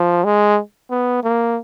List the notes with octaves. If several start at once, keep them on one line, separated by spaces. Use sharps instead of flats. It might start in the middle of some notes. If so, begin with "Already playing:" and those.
Already playing: F3
G#3
B3
A#3